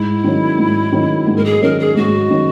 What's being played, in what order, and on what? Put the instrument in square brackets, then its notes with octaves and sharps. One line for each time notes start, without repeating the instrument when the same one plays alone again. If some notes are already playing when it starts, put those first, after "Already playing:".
Already playing: [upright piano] G#2 [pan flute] E4
[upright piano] D#3 F#3 C#4
G#2
D#3 F#3 C#4
G#2
[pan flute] A#4
G#4
[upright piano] D#3 F#3 C#4 [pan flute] A#4
[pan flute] G#4
[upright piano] G#2 [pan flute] F#4
[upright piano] D#3 F#3 C#4